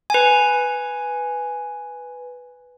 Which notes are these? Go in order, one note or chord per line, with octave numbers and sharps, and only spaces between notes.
B4 G#5